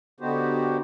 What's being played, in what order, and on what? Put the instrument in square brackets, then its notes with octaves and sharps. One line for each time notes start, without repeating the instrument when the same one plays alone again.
[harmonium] D3 B3 D#4 F#4 G4 C5